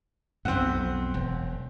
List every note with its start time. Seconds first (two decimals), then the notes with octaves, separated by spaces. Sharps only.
0.45 B1 F2 C4 F#5
1.14 E1